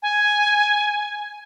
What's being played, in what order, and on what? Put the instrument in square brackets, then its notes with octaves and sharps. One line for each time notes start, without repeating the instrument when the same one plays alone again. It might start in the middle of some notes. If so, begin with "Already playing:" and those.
[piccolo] G#5